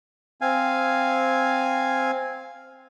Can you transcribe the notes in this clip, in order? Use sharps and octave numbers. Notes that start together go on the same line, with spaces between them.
C4 F5 G#5